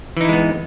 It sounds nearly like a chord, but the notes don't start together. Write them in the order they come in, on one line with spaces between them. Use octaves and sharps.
E3 D#4 E4 G#3 B3